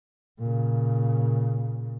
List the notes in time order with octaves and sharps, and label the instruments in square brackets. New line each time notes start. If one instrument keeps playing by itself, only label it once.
[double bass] A#2 C#3